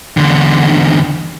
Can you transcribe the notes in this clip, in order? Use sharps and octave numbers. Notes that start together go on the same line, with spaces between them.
E2 D3